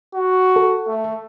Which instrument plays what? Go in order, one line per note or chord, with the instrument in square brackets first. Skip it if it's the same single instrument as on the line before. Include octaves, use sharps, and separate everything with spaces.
[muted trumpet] F#4
[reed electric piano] A4
[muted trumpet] A3